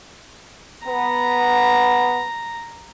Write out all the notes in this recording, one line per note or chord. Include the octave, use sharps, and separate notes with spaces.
B3 A#5